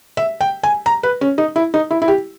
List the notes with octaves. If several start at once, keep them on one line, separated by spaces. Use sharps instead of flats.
E5
G5
G#5
A#5
B4
C#4
D#4
E4
D#4
E4
E4
G4